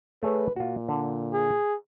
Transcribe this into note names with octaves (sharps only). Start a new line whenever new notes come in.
A3 G#4 B4 C#5
A#2 F4 F#4
D3
G#4